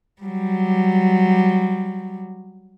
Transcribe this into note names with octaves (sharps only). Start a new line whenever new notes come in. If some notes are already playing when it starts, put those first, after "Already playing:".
F#3 G3